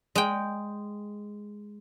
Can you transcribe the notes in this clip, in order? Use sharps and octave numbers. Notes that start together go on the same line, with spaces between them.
G#3 G5